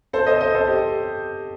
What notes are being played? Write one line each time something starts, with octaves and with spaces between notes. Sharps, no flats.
A4 C5
C5 D#5
C5 D#5
A4 C5
G4